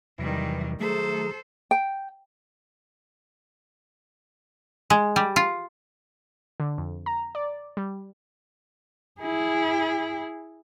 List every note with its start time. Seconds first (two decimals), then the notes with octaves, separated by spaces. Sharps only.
0.18 E2 C3 D#3 E3 F#3 G3
0.80 D#3 F#3 A3 G#4 A4 C5 A#5
1.71 G5
4.90 G#3
5.16 G3
5.36 F4
6.60 D3
6.78 F2
7.06 A#5
7.35 D5
7.77 G3
9.21 E4 G#4